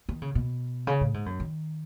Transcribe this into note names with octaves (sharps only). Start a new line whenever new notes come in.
D#3
C#3
B2
C#3
A2
G#2
F#2
D#3